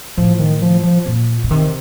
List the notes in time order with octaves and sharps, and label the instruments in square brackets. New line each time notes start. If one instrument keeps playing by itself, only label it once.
[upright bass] A2 [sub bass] F3
[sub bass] D#3
F3
F3
[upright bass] A#2
B2
[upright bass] C3 [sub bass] D#3